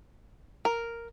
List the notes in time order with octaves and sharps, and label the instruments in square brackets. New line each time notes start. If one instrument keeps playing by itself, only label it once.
[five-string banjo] A#4